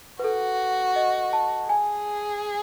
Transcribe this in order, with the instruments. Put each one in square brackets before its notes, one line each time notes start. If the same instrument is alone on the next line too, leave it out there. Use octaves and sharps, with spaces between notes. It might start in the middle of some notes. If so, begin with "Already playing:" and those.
[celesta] B4
[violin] F#4 [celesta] A4
[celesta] D#5
A5
[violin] G#4 [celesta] G#5